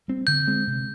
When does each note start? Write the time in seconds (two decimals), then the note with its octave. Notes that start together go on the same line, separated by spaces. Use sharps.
0.08 G3 C4
0.27 D3 G6
0.47 G#3 C4
0.67 C3